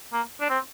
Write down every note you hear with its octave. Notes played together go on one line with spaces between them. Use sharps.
A#3
D4
C4